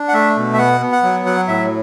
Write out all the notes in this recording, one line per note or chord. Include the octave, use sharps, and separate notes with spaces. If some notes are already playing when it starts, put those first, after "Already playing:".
Already playing: D4
F#5
A3 E5
B2
E5
B3 F#5
B3
F#5
F#3
F#3 F#5
A2 E5